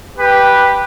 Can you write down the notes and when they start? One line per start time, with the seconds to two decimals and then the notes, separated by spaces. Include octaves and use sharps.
0.17 G4 B4